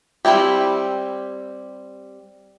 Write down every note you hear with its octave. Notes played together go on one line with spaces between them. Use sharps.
G3 C4 E4 G4